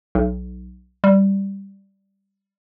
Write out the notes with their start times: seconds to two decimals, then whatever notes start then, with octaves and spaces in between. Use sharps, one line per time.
0.15 B1
1.04 G3